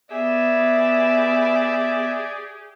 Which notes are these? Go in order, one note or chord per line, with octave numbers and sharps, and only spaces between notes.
B3 G4 G#4 D5 E5